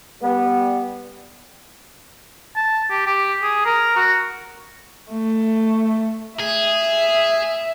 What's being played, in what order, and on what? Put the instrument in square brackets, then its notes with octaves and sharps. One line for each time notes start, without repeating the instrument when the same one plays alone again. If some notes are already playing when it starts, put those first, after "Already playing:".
[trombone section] G3 B3
[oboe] A5
G4
G4
G#4
A#4
F#4
[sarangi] A3
[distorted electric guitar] G#4 [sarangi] E5